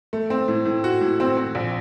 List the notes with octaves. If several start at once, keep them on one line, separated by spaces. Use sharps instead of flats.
A3
C4
A2
A2
F#4
A2
C4
C4
A#1